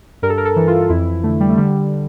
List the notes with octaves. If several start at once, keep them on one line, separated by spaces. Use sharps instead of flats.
G2 A#4
A4
A#4
A4
E3
F4
F2 E4
D3 A3
G3
A3
D3 G3